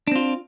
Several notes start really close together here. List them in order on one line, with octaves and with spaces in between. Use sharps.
D4 C4 F4